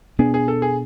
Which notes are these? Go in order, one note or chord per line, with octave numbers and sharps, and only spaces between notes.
B2 B3 D4 G#4
G#4
A4
G#4